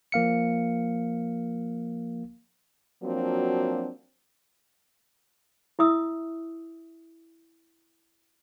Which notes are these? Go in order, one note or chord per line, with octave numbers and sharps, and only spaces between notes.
F3 A#3 F5 C#7
F3 F#3 A#3 C4 D4 F#4
E4 E5 D#6 E6